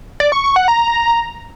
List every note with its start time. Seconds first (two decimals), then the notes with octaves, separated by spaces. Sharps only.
0.20 D5
0.32 C#6
0.44 C#6
0.56 F#5
0.68 A#5